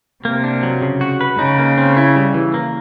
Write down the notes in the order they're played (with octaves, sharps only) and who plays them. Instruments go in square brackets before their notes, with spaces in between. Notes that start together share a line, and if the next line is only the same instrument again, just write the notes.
[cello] C3 [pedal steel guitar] A#3
[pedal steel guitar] D4
F#3
C#3
F#4
B4
[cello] C#3 [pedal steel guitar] D#4
[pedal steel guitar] A#3
C4
E4
G3
E3
A#3